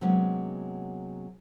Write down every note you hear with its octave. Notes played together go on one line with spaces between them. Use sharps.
C3 F#3 G#3 A#3 B3 C#4